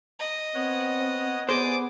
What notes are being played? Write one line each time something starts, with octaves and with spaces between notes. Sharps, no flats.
D#5
B3 C4 C#5 F#5
B3 G#4 C5 D5 G#5 D6 D#6